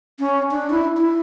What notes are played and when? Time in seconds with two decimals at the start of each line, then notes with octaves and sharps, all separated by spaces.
0.19 C#4
0.51 D4
0.70 E4
0.97 E4